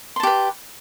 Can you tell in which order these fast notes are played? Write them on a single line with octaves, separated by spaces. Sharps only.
C6 A5 G4 B4